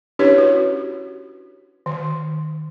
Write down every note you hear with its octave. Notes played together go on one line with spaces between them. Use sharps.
C#4 D4 E4 G4 B4 C#5
F#4
D#3